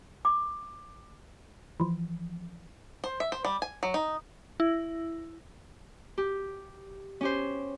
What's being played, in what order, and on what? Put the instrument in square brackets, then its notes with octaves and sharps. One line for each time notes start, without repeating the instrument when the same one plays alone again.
[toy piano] D6
[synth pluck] E3 F3
[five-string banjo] C5
E5
C5
G3
G#5
F#3
D#4
[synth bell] E4
[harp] G4
C#4 G4 C5